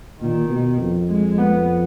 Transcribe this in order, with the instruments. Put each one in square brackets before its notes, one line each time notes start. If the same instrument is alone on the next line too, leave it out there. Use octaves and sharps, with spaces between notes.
[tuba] A#2 [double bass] D#3
[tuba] B2
F2
[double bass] G#3
B3